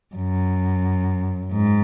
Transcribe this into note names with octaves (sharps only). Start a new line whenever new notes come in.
F#2
G#2